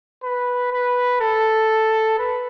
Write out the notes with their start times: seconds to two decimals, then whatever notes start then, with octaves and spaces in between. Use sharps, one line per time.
0.23 B4
0.72 B4
1.21 A4
2.18 B4